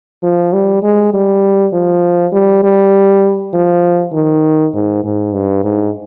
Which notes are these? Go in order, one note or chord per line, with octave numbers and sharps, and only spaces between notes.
F3
G3
G#3
G3
F3
G3
G3
F3
D#3
G#2
G#2
G2
G#2